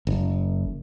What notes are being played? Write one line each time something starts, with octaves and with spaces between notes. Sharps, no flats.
F#1